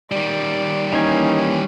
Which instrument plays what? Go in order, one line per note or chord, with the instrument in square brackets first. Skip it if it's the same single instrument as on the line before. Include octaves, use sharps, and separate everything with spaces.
[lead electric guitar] D#3 G3 [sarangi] D5
[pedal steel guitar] E3 A#3 G#5 [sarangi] C#4 [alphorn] D#4